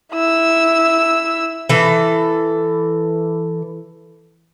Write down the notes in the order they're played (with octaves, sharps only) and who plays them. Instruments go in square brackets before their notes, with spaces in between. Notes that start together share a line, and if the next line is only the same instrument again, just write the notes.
[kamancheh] E4 E6
[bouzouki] E3 A4